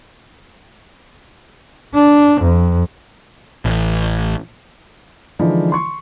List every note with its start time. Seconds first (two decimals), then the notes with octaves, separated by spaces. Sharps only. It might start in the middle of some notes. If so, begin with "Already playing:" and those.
1.95 D4
2.42 F2
3.65 A1
5.39 D3 E3 F3 G#3 D#4
5.72 C6 C#6